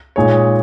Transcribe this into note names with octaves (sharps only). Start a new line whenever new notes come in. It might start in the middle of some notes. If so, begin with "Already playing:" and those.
A#2 G#3 D#4 G#4 C#5